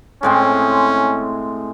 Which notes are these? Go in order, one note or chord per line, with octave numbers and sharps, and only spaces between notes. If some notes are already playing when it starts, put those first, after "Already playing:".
A2 G#3 C4 C#4